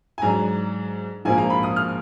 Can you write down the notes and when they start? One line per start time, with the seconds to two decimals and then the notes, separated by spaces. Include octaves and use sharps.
0.18 G#5
0.22 G#2 F#3 D4 A#5
1.25 A#1 G#2 F3 A#3 G#5
1.38 A#5
1.50 B5
1.63 D#6
1.76 F6